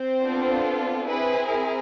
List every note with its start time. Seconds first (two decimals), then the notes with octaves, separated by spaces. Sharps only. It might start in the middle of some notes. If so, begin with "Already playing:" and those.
Already playing: C4 C5
0.22 B3 D4 F4 A4
1.08 C4 E4 G#4 B4
1.51 A#4